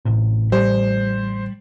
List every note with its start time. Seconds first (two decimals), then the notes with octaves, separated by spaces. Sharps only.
0.05 A1 A2 C3
0.52 G3 C5